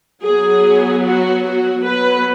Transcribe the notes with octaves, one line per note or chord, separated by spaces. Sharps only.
F#3 B3 G#4
F#4
F#4
F#3 B3 B4